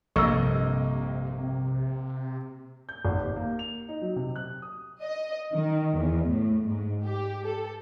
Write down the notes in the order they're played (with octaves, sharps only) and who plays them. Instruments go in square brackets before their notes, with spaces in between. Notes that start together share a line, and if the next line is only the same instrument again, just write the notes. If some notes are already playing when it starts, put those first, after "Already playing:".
[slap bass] A#1 G2 [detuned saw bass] C3 [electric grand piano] A#3 D#5 C#6 [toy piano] A4 E6
[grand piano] G6
G#1
G4
A#3
F7
D#4
F#3
C3
F#6
D#6
[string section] D#5
D#3
E2
A2
G#2
G4
A4